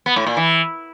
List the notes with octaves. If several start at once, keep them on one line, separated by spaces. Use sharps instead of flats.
B3
A2
A#2
E3